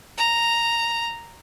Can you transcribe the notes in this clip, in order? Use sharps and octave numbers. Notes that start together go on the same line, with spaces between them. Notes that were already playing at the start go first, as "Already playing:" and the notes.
A#5